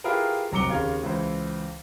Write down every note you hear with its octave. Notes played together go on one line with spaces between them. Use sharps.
E4 F4 G4 G#4 A#4 B4
F1 F#3 A#5 D6 C#7 G7
D#2 C#3 F5 G#6
C#2 E3 C5